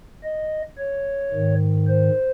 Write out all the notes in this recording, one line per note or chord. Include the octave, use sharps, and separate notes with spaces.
D#5
C#5
G#2 D#3
C5